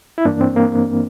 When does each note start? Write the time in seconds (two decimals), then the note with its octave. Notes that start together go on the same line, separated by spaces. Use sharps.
0.18 E4
0.25 G2 E3 A#3 D4
0.41 C4
0.56 A#3